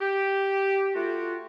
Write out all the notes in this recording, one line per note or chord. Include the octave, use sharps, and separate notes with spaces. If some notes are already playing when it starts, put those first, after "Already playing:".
G4
A3 F4 F#4